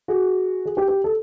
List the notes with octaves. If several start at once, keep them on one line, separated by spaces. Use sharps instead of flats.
F#4 G#4
G#4
G4
G4
A4